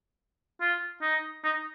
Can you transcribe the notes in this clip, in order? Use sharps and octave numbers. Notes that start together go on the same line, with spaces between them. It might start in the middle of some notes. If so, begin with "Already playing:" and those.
F4
D#4
D#4